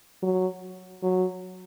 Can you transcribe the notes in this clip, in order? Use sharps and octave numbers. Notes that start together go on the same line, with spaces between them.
F#3
F#3